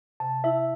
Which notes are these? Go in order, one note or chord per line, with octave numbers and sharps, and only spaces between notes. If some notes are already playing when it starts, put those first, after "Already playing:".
C3 A5
E4 E5